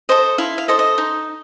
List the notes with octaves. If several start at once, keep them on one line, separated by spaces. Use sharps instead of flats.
A4 C5 D#5
E4 F5
F5
A4 C5 D#5
D#5
D#4